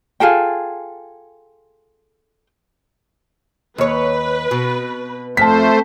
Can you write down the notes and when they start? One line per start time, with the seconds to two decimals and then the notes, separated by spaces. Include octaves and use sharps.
0.20 F4 G#4 A4 G5
3.78 D#2 B4 C#5
4.51 B2
5.37 F2 A3 C5 A5 B6